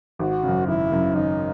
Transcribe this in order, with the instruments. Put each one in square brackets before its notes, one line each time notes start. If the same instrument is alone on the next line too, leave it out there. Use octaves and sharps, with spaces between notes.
[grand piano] G#1 [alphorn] F#4
[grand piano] F#2 C#3
[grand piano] G#1 [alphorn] E4
[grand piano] F#2 C#3
[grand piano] G#1 [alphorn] D#4